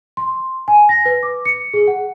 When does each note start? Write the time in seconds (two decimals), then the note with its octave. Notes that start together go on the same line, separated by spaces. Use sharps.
0.17 C6
0.68 G#5
0.89 A#6
1.05 B4
1.23 D6
1.45 C#7
1.74 G#4
1.88 F#5